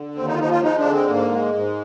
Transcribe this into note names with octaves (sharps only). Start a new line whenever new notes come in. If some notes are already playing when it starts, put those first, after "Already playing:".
Already playing: D3
D#2 C4
D#4
F4
F3 D#4
F4
G#3 D#4
D4
D3
C4
G#2 A#3
G#3
G#2